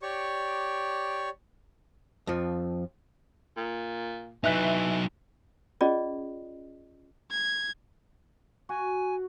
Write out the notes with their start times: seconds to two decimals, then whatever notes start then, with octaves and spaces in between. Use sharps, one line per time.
0.02 G4 C#5 D5 C#6
2.27 F2 F3
3.57 A#2
4.44 E3 F#3 D#4 E5 F#6 B6
5.81 C#4 F4 G#4 D5 D#5
7.31 G#6
8.69 F#4 G#5